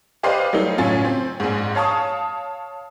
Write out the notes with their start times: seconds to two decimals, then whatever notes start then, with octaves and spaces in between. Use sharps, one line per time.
0.23 G4 B4 C5 D5 D#5 F5
0.53 F#3 G3 A3 D#4
0.78 A2 C#3 F#3 F4 G#5 A6
1.05 C4
1.40 A#1 G#2
1.75 C#5 F5 A5 C#6 D#6